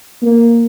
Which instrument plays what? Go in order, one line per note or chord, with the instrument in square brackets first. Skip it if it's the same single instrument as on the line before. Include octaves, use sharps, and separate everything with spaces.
[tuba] A#3